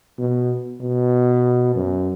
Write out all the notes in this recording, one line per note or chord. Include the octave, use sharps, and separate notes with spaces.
B2
B2
F#2